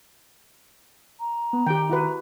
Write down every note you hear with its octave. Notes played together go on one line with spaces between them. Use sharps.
A#5
B3
D#3 G4 G5
E4 F#4 B4